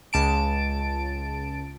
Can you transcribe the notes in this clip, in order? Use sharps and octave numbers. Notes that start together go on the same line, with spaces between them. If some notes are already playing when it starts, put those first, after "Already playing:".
C#2 A5 D7